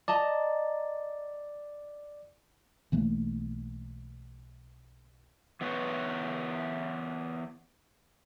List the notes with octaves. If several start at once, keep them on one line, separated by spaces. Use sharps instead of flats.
D5 D#5 A5 A#5
B1 E3 A3 A#3
E3 B3 B4 C#5